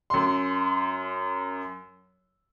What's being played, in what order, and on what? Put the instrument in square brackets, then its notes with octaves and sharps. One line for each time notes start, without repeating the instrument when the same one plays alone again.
[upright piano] F#2 C6